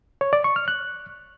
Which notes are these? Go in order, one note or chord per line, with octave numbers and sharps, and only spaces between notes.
C#5
D5
C#6
F6
F#6